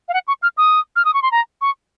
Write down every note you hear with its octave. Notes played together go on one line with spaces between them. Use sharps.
F5
F#5
C#6
F6
D#6
F6
D#6
C#6
C6
A#5
C#6